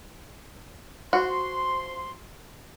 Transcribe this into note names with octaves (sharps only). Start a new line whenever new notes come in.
F3 F#4 C6